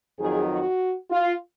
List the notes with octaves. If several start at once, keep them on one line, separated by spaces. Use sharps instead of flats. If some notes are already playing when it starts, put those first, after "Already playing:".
F2 D#3 F#3 G#4
F#4
F4